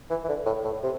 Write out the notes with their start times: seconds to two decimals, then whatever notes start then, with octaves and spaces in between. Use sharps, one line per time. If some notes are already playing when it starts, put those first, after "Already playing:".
0.10 E3
0.24 E3
0.28 D3
0.46 A2
0.64 A2
0.83 C3